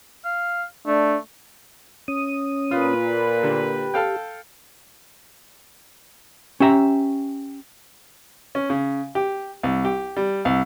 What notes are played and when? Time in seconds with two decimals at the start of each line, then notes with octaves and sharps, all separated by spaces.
0.25 F5
0.87 A3 D4
2.08 C#4 D#6
2.71 A#2 F4 B4
3.43 D3 G4
3.94 A4 F5 G5
6.60 C#4 G4 E5 A#5
8.55 C#4
8.70 C#3
9.15 G4
9.63 C2
9.85 G4
10.16 G3
10.45 C2